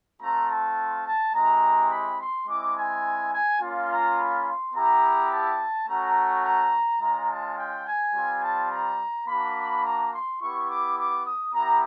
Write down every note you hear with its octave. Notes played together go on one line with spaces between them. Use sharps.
A3 C4 F4 A#5
A5
A5
G#3 C4 E4 G4 A#5
B5
C6
G#3 C4 E4 D6
G#5
G#5
A#3 C#4 F4
A#5
B5
C6
B3 E4 G4 A#5
A5
A3 C#4 F#4 A#5
A#5
G#3 C#4 F4 A#5
A5
G5
G#5
G3 C4 F4
A5
A#5
A#3 D4 F#4 B5
A#5
C6
B3 E4 G4 C#6
D6
D6
D#6
B3 E4 G4 A#5